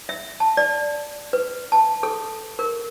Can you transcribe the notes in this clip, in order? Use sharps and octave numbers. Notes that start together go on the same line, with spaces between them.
E5
A5
D5
B4
A5
A4
A#4